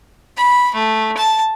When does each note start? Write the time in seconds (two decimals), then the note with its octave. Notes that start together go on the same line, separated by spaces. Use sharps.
0.37 B5
0.74 A3
1.17 A5